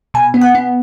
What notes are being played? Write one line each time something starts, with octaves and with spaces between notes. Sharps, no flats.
B2 G#5
B3
F#5
B3